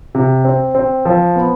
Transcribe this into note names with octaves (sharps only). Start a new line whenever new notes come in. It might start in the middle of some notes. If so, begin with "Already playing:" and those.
C3
C4
C4
F3
B3